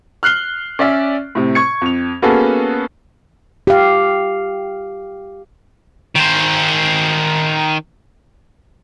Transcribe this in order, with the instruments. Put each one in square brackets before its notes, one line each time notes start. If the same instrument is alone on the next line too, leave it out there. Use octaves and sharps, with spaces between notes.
[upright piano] F6 F#6 C7 G7
C#4 D5 E5
A2 C3
C#6 G#6 C#7
F2 F7
A#3 B3 C#4 F#4 G#4 A4
[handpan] G4 F5
[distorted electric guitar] D#3 C5